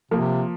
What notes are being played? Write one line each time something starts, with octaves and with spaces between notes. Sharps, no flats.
C3 F3 A#3